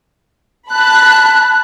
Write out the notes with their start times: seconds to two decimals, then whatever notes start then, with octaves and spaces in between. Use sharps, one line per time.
0.70 A5 B5 F#6